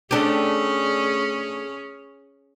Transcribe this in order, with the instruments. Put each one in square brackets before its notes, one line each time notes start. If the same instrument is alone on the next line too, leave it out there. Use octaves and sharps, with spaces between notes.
[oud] A3 D4 G4 [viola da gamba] C#4 G#4